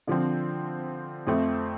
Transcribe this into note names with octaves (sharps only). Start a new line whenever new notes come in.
D3 F3 C4
F2 F3 A3 C4